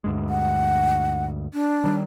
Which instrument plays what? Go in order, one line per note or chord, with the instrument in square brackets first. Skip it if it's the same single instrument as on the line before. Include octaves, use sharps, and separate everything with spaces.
[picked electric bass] D2 G2 G#3
[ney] F#5
D4
[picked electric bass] D#3 F#3 G3